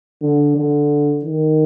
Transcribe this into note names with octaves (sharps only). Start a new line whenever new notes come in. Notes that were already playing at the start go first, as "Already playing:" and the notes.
D3
D3
D#3